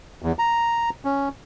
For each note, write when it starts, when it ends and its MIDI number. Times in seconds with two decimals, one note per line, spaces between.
0.22 0.32 40
0.39 0.90 82
1.05 1.29 61